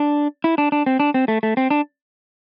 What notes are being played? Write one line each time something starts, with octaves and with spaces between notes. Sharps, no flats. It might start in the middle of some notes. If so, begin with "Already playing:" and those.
Already playing: D4
E4
D4
D4
C4
D4
C4
A3
A3
C4
D4